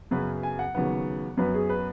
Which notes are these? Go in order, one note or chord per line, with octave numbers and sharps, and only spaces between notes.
F#2 C#3 F#3 B3 B4
G#5
F#5
D#2 C#3 F#3 B3
F#2 F#3 B3 B4
G#4
B4